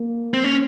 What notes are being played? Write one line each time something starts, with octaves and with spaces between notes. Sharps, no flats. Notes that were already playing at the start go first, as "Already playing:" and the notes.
Already playing: A#3
C4
C#4